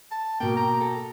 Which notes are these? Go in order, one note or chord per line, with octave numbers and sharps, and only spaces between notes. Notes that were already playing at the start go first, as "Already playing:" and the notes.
A5
B2 A#3 G5
A#5
A4